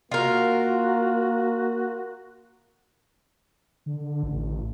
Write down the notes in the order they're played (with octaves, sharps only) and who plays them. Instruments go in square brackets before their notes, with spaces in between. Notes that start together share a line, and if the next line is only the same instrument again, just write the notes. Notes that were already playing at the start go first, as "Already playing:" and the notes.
[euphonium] A#3 [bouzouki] F4 A#4 [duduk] F#4
[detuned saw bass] D3
A1